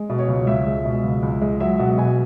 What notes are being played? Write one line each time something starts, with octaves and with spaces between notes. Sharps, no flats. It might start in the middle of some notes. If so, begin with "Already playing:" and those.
Already playing: G#3
B2
C#5
C#2
C#2 E5
G#3
B2
C#2
C#2
G#3
F#3 E5
B2 F#5
B2 G#5